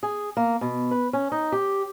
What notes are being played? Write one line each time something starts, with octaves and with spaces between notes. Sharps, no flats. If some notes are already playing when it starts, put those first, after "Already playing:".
G#4
A#3
B2
B4
C#4
D#4
G4